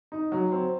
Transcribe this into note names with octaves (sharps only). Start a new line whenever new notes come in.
D#4
F#3
C4